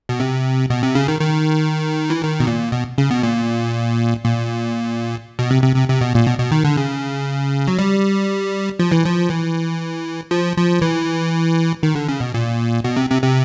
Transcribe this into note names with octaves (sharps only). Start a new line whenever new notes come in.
B2
C3
B2
C3
C#3
D#3
D#3
E3
D#3
B2
A#2
B2
C#3
B2
A#2
A#2
B2
C3
C3
C3
C3
B2
A#2
B2
B2
D#3
D3
C#3
F#3
G3
F3
E3
F3
E3
F3
F3
E3
D#3
D3
C#3
B2
A#2
B2
C3
C3
C3